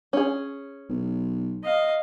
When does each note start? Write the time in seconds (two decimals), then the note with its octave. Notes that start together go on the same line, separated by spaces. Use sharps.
0.13 C#4 G#4
0.89 B1
1.64 D#5 F5